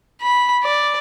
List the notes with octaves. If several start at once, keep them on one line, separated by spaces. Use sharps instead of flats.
B5
D5